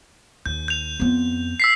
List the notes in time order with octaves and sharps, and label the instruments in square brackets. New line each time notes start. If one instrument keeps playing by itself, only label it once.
[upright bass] D#2 [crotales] G6
[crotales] G6 F7
[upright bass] F2 B3
[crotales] E6 B6 C7